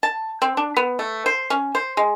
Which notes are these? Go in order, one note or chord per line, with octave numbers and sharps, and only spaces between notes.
A5
C4
D4
B3
A3
C5
C#4
C5
G#3